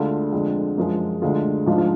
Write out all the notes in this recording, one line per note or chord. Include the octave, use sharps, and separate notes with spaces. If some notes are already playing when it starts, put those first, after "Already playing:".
Already playing: D2 D3 G#3 F4
F2 D3 G#3
F#2 F3 G#3
D2 D3 G#3 F4
G#2 F3 G#3 D4 F4
F4